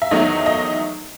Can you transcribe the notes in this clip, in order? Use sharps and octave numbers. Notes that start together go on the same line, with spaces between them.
E5
E2 D#3 F#3 A3 D#5
D#5